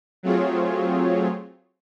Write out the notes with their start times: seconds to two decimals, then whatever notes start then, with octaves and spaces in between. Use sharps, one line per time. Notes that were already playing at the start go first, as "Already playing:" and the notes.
0.23 F#3 A3 C4 F4 G#4 C#5